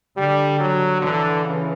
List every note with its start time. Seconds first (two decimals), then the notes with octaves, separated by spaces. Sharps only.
0.17 D3 G3
0.60 F#3
1.01 D3 E3
1.44 C#3